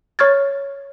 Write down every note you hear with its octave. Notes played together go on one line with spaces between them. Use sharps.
C#5 C#6 F6 G#6 A6